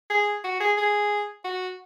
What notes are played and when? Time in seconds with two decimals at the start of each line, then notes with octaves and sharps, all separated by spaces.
0.10 G#4
0.44 F#4
0.60 G#4
0.78 G#4
1.44 F#4